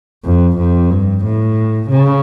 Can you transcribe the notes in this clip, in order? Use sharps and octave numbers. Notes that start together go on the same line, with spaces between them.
F2
F2
G2
A2
C#3